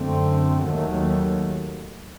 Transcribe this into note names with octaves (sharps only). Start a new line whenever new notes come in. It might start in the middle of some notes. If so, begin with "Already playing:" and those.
Already playing: F#2 D3 A3 C4
D#2 D#3 F#3 A3